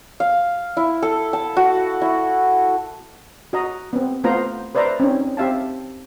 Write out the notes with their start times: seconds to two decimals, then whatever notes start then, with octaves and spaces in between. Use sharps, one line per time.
0.20 F5
0.77 E4
1.02 A4
1.33 A5
1.57 F#4
2.01 E4
3.53 F#4 D#5 A#5
3.93 B3 C4
4.24 A3 B3 F4 C5 A#5
4.75 B4 C5 D5 E5 A#5
5.00 C4 C#4 D#4
5.37 C4 G4 E5 F5 A5